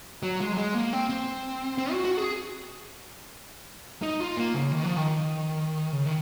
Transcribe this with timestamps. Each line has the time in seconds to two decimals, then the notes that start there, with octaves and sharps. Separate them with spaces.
0.23 F#3
0.41 G#3
0.53 F#3
0.57 G#3
0.74 A#3
0.93 C4
1.10 C4
1.78 C4
1.92 F#4
2.05 F#4
2.17 G#4
4.02 D#4
4.20 F4
4.37 A#3
4.54 C#3
4.72 D#3
4.84 F3
4.97 D#3
5.92 C#3
6.06 D#3